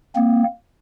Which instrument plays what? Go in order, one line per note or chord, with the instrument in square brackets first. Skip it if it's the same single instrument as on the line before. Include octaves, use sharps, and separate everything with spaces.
[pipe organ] A#3 C4